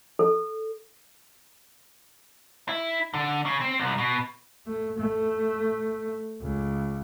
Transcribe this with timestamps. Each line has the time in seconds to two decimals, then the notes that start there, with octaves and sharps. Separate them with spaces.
0.19 A4
2.69 E4
3.14 D3
3.46 C#3
3.60 C4
3.79 C2
3.98 B2
4.67 A3
4.98 A3
6.41 C#2